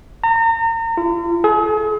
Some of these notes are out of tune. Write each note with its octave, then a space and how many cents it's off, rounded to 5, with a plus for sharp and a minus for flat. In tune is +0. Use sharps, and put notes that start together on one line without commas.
A#5 -35
F4 -45
G#4 +40